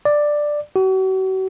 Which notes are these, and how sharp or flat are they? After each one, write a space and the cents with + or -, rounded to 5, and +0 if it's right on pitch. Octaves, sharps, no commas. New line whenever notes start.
D5 +10
F#4 +40